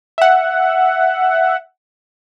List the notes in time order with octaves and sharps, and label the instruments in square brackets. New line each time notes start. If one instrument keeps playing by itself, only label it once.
[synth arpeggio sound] E5 F#5